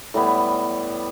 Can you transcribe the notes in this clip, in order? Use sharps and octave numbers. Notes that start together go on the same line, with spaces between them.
A2 G3 B3 C#5